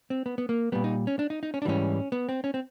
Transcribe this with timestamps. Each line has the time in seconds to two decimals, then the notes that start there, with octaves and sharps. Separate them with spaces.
0.10 C4
0.26 B3
0.38 B3
0.49 A#3
0.72 A#2 G3 B3
0.84 D#4
1.07 C#4
1.19 D4
1.30 D#4
1.43 D#4
1.54 C#4
1.62 D4
1.65 G#2 E3 G3 C#4
2.12 B3
2.29 C4
2.44 C#4
2.54 C4